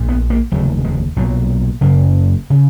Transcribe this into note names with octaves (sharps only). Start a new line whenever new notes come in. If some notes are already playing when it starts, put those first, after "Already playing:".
Already playing: A#1 A#2
B3
A#3
F1 D#2 C#3 F#3
G#3
B1 A#2 F#3
F#1 F#2 C#3 A#3
C#3